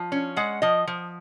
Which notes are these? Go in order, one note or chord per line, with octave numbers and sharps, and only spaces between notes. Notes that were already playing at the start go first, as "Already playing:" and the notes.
Already playing: F3
C#4
G#3 F#5
F3 D#5
F3